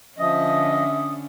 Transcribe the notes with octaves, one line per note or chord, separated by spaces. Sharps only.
D3 F3 C#4 D#5 E5 D#6